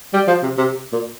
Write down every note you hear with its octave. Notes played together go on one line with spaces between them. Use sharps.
G3
F3
C3
C3
A#2